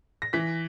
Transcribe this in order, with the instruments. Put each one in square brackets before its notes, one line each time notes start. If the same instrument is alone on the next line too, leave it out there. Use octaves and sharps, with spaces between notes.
[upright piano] A#6
E3 B6